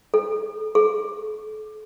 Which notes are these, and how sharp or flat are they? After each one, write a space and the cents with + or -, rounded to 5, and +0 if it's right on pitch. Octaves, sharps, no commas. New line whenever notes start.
A4 -30
A4 -40